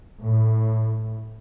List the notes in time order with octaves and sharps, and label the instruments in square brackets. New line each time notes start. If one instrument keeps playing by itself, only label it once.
[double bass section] A2